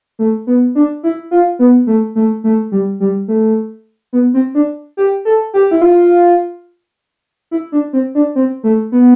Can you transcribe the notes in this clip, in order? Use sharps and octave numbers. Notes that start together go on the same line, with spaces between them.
A3
B3
D4
E4
F4
B3
A3
A3
A3
G3
G3
A3
B3
C4
D4
G4
A4
G4
E4
F4
E4
D4
C4
D4
C4
A3
B3